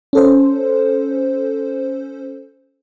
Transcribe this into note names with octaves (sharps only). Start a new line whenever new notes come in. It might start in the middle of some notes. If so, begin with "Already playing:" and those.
C#4 A4 C5